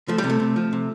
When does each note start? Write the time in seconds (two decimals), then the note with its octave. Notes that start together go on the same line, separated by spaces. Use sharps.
0.08 F3 A3
0.18 G3
0.24 C3
0.30 A3
0.40 C3
0.56 F3
0.73 C3